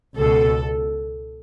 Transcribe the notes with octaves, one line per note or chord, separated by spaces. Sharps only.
C#2 B2 A4